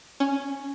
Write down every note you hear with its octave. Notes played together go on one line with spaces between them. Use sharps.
C#4